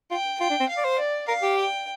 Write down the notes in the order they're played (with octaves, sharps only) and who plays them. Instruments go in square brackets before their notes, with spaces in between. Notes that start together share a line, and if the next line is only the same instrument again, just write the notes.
[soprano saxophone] F4 [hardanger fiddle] G5
[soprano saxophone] F4 [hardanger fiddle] G5
[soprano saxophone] D4
C4
[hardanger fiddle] F5
[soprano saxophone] D5
C5
[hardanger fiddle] D5
[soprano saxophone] A#4 [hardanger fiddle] F5
[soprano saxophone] G4
[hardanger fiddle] G5